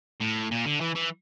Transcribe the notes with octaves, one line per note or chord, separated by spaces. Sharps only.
A2
A#2
D3
E3
E3